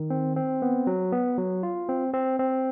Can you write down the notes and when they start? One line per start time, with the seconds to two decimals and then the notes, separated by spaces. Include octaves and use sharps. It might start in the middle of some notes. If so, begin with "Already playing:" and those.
Already playing: D#3
0.10 C4
0.36 C4
0.62 B3
0.87 F#3
1.12 B3
1.38 F#3
1.63 F4
1.89 C4
2.14 C4
2.39 C4